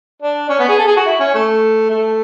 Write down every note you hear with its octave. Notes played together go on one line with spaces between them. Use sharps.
D4
C#4
B3
G#4
A4
G#4
F#4
E4
C#4
A3
A3